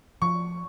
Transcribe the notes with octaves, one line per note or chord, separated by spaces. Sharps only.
F3 C#6